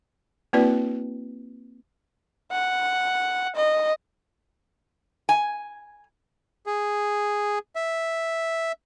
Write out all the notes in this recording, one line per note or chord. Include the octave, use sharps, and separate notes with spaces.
A#3 C4 E4 F#4 B4 D5
F#5
D#5
G#5
G#4
E5